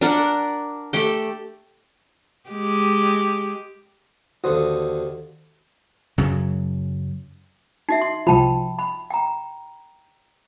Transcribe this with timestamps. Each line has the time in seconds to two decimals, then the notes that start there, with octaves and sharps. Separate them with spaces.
0.01 D4 A#4 F#5
0.93 A3 G4 G5
2.49 G#3 G4
4.44 D#2 D3 F#4 C5 D#6
6.18 F#2 C#3 F#3
7.89 D#4 F#4 E5 C7
8.01 C6
8.27 C2 F3 G5 A5 B5
8.79 B5
9.10 G5 A#5